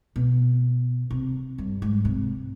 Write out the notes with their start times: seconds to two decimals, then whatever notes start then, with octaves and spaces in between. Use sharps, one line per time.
0.16 B2
1.11 C3
1.58 G2
1.82 G#2
2.05 C3